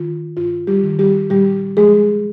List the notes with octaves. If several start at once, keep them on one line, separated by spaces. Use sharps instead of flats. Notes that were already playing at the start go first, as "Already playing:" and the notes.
Already playing: D#3 F4
G2 F4
G3 G4
D#3
G3 G4
A#2 G3 G4
F3 G#3 G#4